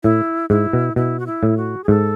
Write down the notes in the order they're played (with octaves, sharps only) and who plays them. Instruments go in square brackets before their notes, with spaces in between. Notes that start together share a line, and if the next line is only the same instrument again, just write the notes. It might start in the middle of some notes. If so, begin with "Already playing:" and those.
[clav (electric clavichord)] A2 [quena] E4
[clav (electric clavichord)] G#2 [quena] E4
[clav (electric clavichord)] B2
[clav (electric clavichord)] B2 [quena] E4
[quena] F#4
E4
[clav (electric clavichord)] A2
[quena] F#4
G#4
[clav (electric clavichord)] G#2 [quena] A4